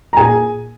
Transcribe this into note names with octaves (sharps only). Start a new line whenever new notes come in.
A#5
A#2 G#4 G#5